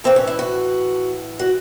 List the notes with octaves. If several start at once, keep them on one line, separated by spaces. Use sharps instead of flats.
A2 E3 C4
C#4
E4
F#4
F#4